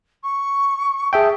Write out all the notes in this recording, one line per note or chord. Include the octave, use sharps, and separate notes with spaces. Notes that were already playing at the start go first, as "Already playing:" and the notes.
C#6
G#4 E5 G5 A5